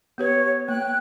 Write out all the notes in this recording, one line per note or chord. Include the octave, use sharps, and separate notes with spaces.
B3 G4 B4 C#5
A#3 G5 F#6